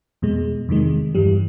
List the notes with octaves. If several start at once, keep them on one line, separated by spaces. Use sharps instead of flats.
E2 B2 G#3
E2 C3 D#3 G#3
G2 E3 G3